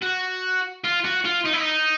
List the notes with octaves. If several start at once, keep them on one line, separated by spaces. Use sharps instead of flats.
F#4
F4
F#4
F4
D#4
E4
D#4